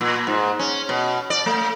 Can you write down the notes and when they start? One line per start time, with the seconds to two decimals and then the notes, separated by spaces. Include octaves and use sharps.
0.01 A#2
0.27 G#2
0.59 C#4
0.89 B2
1.30 D5
1.46 A3